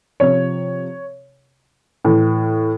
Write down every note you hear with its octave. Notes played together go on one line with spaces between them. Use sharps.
C3 F3 C#5
A2 E3